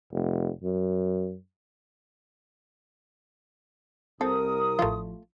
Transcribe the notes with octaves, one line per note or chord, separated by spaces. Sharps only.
F1
F#2
C2 C4 A4 A#4 D#6
A1 F3 A3 F4